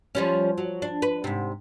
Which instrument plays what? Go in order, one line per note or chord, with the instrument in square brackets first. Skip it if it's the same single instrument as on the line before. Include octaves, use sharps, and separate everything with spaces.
[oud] F3 G3 C#4
F#3
D4
B4
G#2 C3